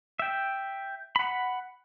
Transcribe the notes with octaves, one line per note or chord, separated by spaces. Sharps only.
E5 G5
F#5 B5